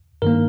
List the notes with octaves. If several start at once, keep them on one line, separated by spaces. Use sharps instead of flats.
G2 D#3 A#3 A#4